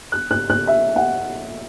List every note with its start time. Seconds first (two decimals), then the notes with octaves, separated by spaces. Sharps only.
0.12 F#6
0.31 F#6
0.50 F#6
0.67 E5
0.96 F#5